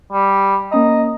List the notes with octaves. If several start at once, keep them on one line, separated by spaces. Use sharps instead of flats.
G3
A#3 C#4 D#5 A#5